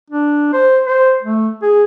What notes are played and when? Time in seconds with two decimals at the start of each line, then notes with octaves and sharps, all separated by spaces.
0.10 D4
0.53 C5
0.87 C5
1.22 A3
1.62 G#4